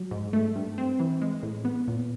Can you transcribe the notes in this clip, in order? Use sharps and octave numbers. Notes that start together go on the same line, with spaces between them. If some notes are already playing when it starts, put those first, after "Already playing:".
Already playing: F#3
G#2
A3
G2
C4
E3
G#3
A2
B3
A#2